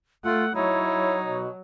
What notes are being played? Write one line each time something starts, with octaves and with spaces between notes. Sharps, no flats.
A3 F4 F#5
F#3 D#4 E4 C#5
B2